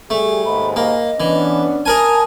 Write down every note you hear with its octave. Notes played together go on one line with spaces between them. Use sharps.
G3 A3 G#4
D#2 G#2 B5
A#3 D#5
E3 B3 C#4 D4
G#4 A#4 G#5 A5